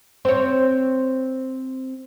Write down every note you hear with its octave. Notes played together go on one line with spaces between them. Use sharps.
C4 C#5